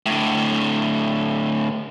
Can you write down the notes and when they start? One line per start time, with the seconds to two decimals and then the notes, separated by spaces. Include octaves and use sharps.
0.06 A2 D3